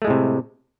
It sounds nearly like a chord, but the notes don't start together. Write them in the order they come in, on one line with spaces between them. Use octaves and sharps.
A3 G#3 A2 C3